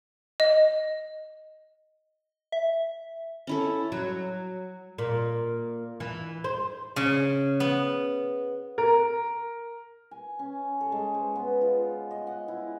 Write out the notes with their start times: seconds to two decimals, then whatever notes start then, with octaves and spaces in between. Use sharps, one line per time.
0.40 D#5
2.52 E5
3.47 C#4 E4 A4
3.92 F#3
4.98 A#2
6.00 E3
6.44 C5
6.96 C#3
7.60 B3
8.78 A#4
10.11 G#5
10.39 C#4
10.81 A4
10.92 G#3
11.14 C5
11.36 B3
11.61 F4
12.11 D#5
12.27 F#5
12.48 E4